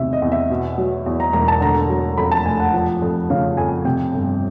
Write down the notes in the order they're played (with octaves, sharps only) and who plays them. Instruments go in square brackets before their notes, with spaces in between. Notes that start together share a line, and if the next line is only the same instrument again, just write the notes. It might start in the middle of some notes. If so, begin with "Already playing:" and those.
Already playing: [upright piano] E2 C3 D#3 E5
D#5
E2
E5
B2
F#3
E2
A#5
E1 A#5
A5
D3 A#5
F#3
F2 B5
A5
F1 G#5
F#5
F3
F2
C#3 F5
F2 G#5
C3 G5
G1